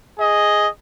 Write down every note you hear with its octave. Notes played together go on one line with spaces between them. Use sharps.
G#4 D#5